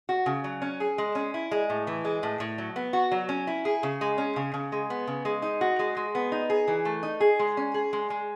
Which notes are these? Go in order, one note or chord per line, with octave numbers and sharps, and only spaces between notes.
F#4
C#3
F#3
C#4
G#4
G#3
C#4
E4
G#3
A2
E3
G#3
A2
A2
F#3
B3
F#4
F#3
C#4
E4
G#4
C#3
G#3
C#4
C#3
C#3
G#3
B3
C#3
G#3
D#4
F#4
G#3
G#3
B3
D#4
G#4
E3
A3
D#4
G#4
G#3
C#4
G#4
G#3
G#3